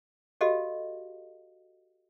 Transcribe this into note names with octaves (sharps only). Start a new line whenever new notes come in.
F#4 G4 A4 D#5 F5